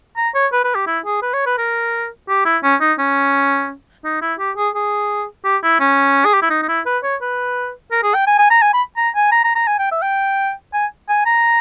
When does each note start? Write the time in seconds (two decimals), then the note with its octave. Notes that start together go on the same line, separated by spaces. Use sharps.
0.17 A#5
0.34 C#5
0.52 B4
0.64 B4
0.75 G4
0.87 E4
1.05 G#4
1.22 B4
1.34 C#5
1.46 B4
1.58 A#4
2.29 G4
2.45 E4
2.63 C#4
2.81 D#4
2.98 C#4
4.04 D#4
4.22 E4
4.39 G4
4.57 G#4
4.75 G#4
5.44 G4
5.63 E4
5.80 C#4
6.25 G#4
6.34 G4
6.42 E4
6.50 D#4
6.62 D#4
6.68 E4
6.86 B4
7.03 C#5
7.21 B4
7.91 A#4
8.03 G#4
8.14 G5
8.27 G#5
8.38 G#5
8.50 A#5
8.62 G#5
8.74 B5
8.97 A#5
9.15 G#5
9.32 A#5
9.44 A#5
9.55 A#5
9.67 G#5
9.79 G5
9.91 E5
10.02 G5
10.73 G#5
11.09 G#5
11.26 A#5